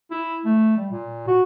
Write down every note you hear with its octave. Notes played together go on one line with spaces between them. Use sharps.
E4
A3
G3
A#2
F#4